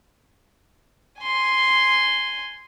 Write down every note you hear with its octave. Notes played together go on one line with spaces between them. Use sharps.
G#5 C6